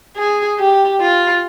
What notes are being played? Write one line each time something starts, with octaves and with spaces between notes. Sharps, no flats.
G#4
G4
F4